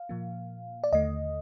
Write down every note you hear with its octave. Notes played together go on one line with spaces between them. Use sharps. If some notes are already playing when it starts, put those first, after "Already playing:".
Already playing: F5
A#2 F3 A#3
D5
D#2 D3 A3 D#5